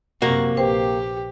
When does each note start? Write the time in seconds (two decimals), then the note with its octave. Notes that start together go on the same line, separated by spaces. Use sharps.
0.22 F#2 C3 A#3 F#4
0.57 A#1 G4 B4 C5 G5